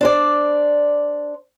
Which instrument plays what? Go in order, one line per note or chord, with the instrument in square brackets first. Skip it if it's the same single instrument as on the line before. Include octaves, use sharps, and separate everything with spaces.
[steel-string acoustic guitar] D4 C5 D5